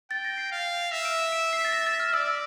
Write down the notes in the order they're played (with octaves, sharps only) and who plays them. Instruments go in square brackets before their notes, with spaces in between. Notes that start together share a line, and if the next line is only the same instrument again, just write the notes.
[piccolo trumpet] G5 [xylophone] A6
[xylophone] A#6
C7
[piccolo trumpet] F5
[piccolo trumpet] E5 [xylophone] A#6
[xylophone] D7
E7
D7
C7
A6
A#6
A6
F6
[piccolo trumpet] D5 [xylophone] E6